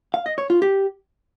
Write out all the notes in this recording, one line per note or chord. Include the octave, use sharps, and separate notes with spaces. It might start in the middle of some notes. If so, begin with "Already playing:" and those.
F5
D#5
C#5
F4
G4